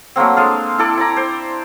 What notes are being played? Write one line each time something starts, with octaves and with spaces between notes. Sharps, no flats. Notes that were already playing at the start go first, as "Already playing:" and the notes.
F#3 A3 A#3 C4
G#3 D4 F5
E4 A4 D5
E4 D5 A#5
C5